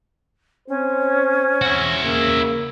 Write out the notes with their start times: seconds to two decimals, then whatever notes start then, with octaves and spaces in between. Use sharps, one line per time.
0.69 C4 C#4 C5
1.62 E4 F#4
2.03 C#3 A#3